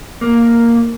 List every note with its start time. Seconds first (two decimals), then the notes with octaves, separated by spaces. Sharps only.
0.21 A#3